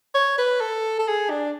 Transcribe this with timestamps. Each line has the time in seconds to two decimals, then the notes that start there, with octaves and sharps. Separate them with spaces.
0.14 C#5
0.39 B4
0.61 A4
0.99 A4
1.08 G#4
1.30 D4